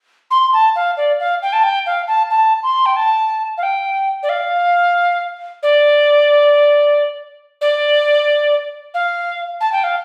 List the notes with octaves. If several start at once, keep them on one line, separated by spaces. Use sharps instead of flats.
C6
A5
F5
D5
F5
G5
A5
G5
F5
A5
A5
C6
G5
A5
F5
G5
D5
F5
D5
D5
F5
A5
G5
F5